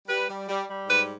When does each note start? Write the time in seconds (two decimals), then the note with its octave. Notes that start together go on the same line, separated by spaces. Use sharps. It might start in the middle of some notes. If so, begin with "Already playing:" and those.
0.08 G3 B4
0.28 G3
0.48 G3
0.68 G3
0.88 G#2 B4